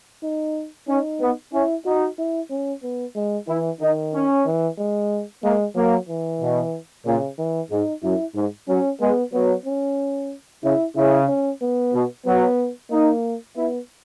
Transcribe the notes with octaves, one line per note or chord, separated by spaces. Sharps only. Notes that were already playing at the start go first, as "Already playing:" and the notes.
D#4
C#4 D#4
B3
C#4 E4
D#4 F#4
E4
C#4
B3
G#3
E3 E4
D#3 D#4
C#4
E3
G#3
G#3 A#3
F#3 A#3
E3
B2
A#2 C#3
E3
G#2 D#4
F#2 E4
G#2
F#3 C#4
G#3 B3
F#3 B3
C#4
C#3 E4
C#3 E4
C#4
B3
B2
F#3 B3
A#3 D#4
B3 E4